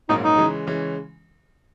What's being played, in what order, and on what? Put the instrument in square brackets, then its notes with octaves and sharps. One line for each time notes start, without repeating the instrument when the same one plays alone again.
[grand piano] A#1 G#2 F#3 A#3 C#4 [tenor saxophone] D#4
[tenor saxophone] D#4
[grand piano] C#3 E3 G#3 C#4
C#3 E3 G#3 C#4